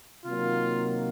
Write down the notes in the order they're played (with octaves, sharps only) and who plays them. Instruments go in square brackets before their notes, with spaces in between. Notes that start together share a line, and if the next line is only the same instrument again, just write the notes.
[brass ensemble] C3 D#3 F#3 A#3 F4